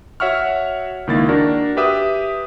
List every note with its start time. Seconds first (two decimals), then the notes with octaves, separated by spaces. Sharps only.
0.20 F#4 C#5 E5 F#5 C#6 F6
1.07 C#2 D#3 A#3 E4 A6
1.29 D4 F#4 A#4
1.77 G4 B4 E5 D6 D#6